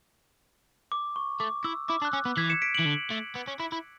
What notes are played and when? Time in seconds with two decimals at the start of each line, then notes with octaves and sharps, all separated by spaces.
0.92 D6
1.16 C#6
1.40 A3 D6
1.64 E4 E6
1.89 E4 D6
2.02 D4
2.05 F#6
2.13 C#4 E6
2.25 B3
2.37 E3 G#6 B6
2.50 C#7 E7
2.62 B6 D7
2.75 E3 D7 F#7
2.86 D3
3.11 A3
3.35 B3
3.47 C#4
3.59 E4
3.72 E4